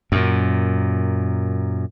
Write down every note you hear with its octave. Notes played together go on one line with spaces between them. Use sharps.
F#2 A#2